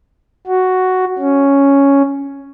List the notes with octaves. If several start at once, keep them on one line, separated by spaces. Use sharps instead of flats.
F#4
C#4